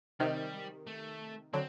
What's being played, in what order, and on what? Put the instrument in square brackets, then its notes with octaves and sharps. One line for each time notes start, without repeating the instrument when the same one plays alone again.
[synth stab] C3 D#3 [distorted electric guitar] G3
[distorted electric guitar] A3
[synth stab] D3 F#3 [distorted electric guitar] C4